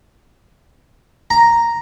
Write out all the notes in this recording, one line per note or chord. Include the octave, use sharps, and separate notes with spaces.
A#5